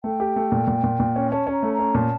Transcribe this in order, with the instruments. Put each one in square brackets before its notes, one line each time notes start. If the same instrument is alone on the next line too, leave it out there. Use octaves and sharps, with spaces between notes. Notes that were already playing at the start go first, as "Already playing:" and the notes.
[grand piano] A3 [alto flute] G5
[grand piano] G4
A3
A#2
A#2
A#2
A#2
C#4
[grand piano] C#4 [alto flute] A5
[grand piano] C#4
[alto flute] A#5
[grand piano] A3
[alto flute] A#5
[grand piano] C#4
[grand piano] A#2 [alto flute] A5